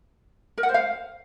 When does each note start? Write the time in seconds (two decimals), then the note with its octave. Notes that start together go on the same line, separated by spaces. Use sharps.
0.58 A#4
0.63 F#5
0.69 C5
0.74 F5